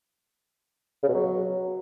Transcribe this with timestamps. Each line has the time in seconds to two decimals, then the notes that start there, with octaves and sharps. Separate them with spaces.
1.03 C#3
1.09 B2
1.14 F#3